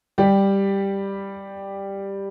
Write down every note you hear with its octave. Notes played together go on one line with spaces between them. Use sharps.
G3 G4